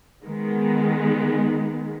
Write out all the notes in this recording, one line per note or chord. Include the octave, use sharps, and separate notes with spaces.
D#3 G#3 B3